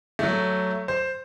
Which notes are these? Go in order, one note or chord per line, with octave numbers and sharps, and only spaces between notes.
F#3 A3
C5